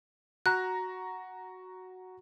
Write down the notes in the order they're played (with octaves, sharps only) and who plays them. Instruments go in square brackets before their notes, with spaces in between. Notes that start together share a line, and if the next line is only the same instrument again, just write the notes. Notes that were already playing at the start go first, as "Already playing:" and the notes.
[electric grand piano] F#4 A#5 [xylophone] F#6